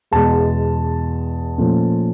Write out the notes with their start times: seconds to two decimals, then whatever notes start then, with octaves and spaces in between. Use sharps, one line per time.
0.11 E2 B2 G#3 A5
1.58 A#2 F3 A3 C#4